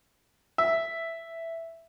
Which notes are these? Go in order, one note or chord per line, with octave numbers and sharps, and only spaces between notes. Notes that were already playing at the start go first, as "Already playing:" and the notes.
E5